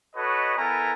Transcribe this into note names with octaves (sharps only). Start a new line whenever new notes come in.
F#4 A4 B4 C#5 D#5
B3 E4 A4 A#4 G#5 A#5